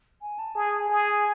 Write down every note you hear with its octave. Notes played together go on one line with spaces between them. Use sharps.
G#5
A5
G#4 G#5
G#5
G#4